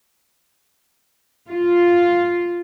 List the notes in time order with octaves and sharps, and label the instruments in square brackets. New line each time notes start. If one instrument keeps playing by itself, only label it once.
[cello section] F4